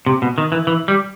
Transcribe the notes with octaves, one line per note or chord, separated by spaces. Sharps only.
C3
B2
D#3
E3
E3
G3